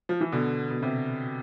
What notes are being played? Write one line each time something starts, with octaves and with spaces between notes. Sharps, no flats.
F3
E3
B2 D3
B2
C3